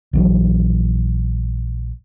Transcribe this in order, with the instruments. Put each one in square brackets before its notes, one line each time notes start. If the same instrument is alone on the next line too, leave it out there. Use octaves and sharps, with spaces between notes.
[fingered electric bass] A#1 E3 F#3